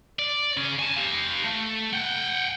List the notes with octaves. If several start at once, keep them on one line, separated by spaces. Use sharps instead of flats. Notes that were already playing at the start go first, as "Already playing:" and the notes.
D5
C#3 C#4
G#5 A5
G4 F5
A3
F#5 G5